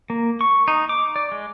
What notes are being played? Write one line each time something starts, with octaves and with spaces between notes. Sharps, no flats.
A#3
C#6
D#4
D6
D5
G#3